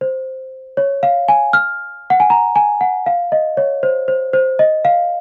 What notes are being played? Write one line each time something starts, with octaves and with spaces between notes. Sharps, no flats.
C5
C#5
F5
G#5
F6
F#5
G#5
A#5
G#5
F#5
F5
D#5
C#5
C5
C5
C5
D#5
F5